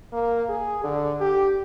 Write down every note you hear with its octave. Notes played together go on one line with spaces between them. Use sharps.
A#3
G#4
D3
G4